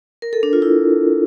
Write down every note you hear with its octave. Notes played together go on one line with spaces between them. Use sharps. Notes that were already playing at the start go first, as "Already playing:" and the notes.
A#4
A4
D4
F4
E4